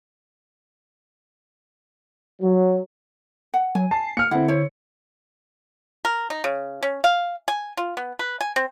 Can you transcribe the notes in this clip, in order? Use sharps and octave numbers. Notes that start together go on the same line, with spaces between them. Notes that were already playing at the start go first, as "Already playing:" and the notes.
F#3
F#5
F#3 G#5
A5 C7
A#3 F6 C#7
D3 C4 E4 F5 F#5
E4 C5 C#5
A#4
D#4
C#3
C#4
F5
G#5
F4
B3
B4
G#5
C4